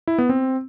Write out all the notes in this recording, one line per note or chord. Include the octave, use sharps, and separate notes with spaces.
E4
B3
C4